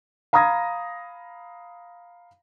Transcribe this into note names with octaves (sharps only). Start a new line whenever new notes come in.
F5 A#5 B5 D#6 G#6 A#6